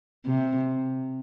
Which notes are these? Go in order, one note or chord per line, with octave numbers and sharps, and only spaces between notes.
C3